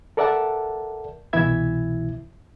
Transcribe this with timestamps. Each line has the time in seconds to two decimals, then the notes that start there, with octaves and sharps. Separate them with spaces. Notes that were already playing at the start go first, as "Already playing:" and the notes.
0.17 A4 A#4 D5 E5 F#5 A5
1.33 C2 B2 E3 E4 E5 G#6